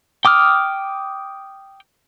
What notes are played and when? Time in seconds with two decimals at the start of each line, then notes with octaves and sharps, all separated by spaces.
0.25 G5 D6 D#6 F6